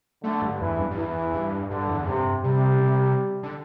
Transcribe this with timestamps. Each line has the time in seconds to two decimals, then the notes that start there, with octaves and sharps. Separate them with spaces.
0.23 D3 A3
0.42 G2
0.60 E2 E3
0.79 G2
0.91 G2
0.97 E2 E3
1.34 G2
1.70 G2 D3
1.89 E2
2.07 G2 C3
2.44 C3 G3
2.81 C3
3.43 D3